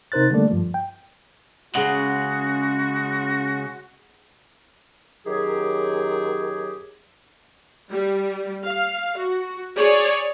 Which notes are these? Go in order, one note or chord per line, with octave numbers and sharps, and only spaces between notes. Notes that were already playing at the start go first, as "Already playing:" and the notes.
C3 D#4 A#4 C5 F#6 A6
D3 G3 A3 A#3 A4 D5
G2 F3
G5
C#3 G#3 C#4 F#4 G#4 F#5
F#2 D#3 F#3 G4 G#4
G3
F5
F#4
G#4 C#5 D5